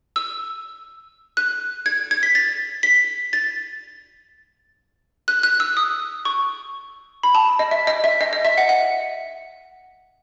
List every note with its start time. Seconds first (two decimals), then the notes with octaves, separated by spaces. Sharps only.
0.16 E6
1.37 F#6
1.86 G#6
2.11 G#6
2.23 B6
2.35 A6
2.83 B6
3.33 A6
5.28 F#6
5.43 F#6
5.60 E6
5.77 D#6
6.25 C#6
7.23 B5
7.35 A5
7.59 D#5
7.71 E5
7.87 D#5
8.04 E5
8.21 D#5
8.33 D#5
8.45 E5
8.58 F#5
8.69 F#5